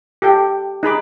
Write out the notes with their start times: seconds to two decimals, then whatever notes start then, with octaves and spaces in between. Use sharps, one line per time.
0.22 G4 A4 G5
0.83 D#4 G#4 B5 D6